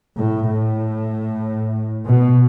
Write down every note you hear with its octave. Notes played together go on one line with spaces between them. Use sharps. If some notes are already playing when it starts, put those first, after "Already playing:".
A2
A2
B2